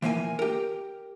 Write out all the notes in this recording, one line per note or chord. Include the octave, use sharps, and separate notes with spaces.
E3 F3 A#3 F5 G#5
G4 A#4